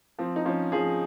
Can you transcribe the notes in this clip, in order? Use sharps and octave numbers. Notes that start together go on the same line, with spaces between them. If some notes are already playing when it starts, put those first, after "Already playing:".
F3 C4
D#4
F3 C#4
F3 G#4